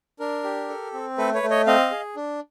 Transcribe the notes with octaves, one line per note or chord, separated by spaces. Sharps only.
D4 A#4
G4
A4
C4
A3 A4 B4
B4 C#5
A3
C#5 D#5
C4 D#5 F5
G#4
D4